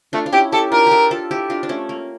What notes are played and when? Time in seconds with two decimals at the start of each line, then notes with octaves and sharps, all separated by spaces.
0.13 A3 D4 F4
0.26 F4
0.33 C#4 E4 G4
0.52 E4 G4 A4
0.72 D4 F4 A#4
0.87 F4 G4 A4
1.11 F4 A4
1.31 E4 G4
1.50 D4 F4
1.63 D4
1.69 A3 C#4
1.89 A#3